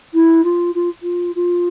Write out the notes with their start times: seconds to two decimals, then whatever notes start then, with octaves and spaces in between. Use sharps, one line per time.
0.14 E4
0.44 F4
0.74 F4
1.02 F4
1.35 F4